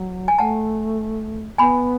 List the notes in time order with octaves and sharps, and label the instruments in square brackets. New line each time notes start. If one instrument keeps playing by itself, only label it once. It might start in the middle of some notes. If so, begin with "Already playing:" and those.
Already playing: [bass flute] F#3
[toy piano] G#5
[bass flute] A3 [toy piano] F#5 A5
[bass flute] B3 [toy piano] G#5 B5